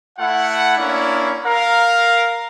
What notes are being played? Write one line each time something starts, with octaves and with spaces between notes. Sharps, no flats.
A3 E4 F#5
A#3 C#4 D4 E4
A#4 F5